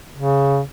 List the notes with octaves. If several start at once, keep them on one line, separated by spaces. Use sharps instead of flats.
C#3